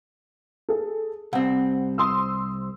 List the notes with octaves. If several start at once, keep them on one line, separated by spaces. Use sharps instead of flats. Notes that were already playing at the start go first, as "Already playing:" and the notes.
G#4 A4
C2 C4 F#5
C6 D#6 E6